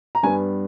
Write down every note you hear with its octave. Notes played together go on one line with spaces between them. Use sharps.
A#5
G2 G3 B3 G#5